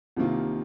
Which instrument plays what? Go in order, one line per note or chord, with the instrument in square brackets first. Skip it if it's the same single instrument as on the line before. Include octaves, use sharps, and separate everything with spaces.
[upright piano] C2 C3 D#3 A#3 F4